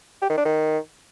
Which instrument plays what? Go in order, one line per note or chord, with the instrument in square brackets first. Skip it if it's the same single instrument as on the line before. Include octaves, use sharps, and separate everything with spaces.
[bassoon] G4
D#3
D4
D#3